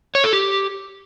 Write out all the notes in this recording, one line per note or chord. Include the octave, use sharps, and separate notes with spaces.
C#5
A4
G4